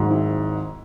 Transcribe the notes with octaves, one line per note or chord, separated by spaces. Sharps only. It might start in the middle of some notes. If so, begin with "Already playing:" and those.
Already playing: G#1 G#2 F#3
E4